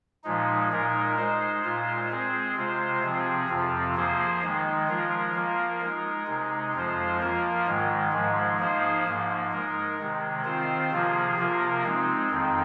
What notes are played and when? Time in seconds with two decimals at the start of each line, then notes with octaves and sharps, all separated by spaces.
0.24 A#2 F3 G#3 D#4
0.71 A#2 G#3 D#4 A#4
1.17 G#3 D#4 C5
1.63 A#2 G#3 F4 C5
2.10 G#3 C4 G#4 C5
2.56 C3 G#3 F4 C5
3.03 C3 F3 C4 G#4
3.49 F2 C3 F3 C4 F4
3.96 F3 A#3 G#4 C5
4.42 D#3 G#3 D#4
4.88 F3 G#3 F4 A#4
5.34 F3 A#3 F4 A#4
5.81 G#3 D#4 A#4
6.27 C3 G#3 D#4
6.74 F2 F3 G#3 F4 C5
7.20 F3 A#3 F4 A#4
7.67 G#2 D#3 G#3
8.13 G#2 F3 G#3
8.59 F3 A#3 D#4 G#4 C5
9.06 G#2 F3 A#3
9.52 G#3 D#4 A#4
9.99 C3 D#3 G#3
10.44 D#3 C4 F4 C5
10.91 C3 F3 A#3 F4 G#4
11.37 C3 F3 A#3 F4 A#4
11.84 G#3 C4 D#4
12.30 F2 D#3 C4 D#4